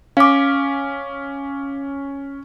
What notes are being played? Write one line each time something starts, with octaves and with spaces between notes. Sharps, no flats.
C#4 F5 D6